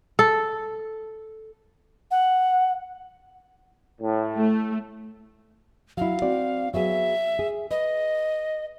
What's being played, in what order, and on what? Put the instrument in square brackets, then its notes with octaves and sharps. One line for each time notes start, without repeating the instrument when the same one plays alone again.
[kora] A4
[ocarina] F#5
[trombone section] A2
[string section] A3
[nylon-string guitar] F#3 E4 [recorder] F5
[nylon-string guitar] C4 F#4 D5
[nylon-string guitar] F#3 B3 G#4 [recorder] E5
[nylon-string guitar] G#4
[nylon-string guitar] B4 [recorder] D#5